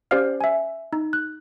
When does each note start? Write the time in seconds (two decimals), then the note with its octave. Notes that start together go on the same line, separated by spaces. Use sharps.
0.11 C#4 G4 C5 D5 F5 F6
0.41 E5 G#5
0.93 D#4
1.13 F#6